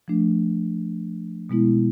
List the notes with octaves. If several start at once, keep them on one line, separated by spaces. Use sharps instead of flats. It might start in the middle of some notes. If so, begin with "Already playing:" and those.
F3 A3 D4
B2 G#3 B3 E4